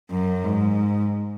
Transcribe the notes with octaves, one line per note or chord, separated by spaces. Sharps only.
F#2
G#2